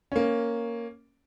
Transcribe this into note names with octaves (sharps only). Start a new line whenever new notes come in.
A#3 C#4